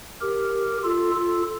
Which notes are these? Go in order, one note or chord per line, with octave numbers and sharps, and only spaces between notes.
G4 A#4
F4 A4
F4 A4